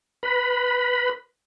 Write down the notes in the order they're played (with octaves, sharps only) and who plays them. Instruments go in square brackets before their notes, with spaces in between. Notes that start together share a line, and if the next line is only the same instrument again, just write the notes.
[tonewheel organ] B4 B5